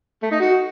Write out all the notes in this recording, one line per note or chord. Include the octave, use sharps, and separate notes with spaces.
A3
D#4
F#4